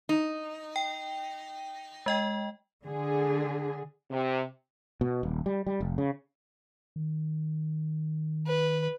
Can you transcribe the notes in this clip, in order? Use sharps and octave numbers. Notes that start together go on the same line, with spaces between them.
D#4
G5
G#3 D#5 G5
D3 G#4
C3
B2
D#1
G3
G3
F1
C#3
D#3
B4